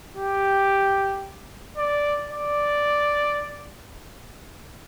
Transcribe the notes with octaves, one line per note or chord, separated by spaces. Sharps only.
G4
D5
D5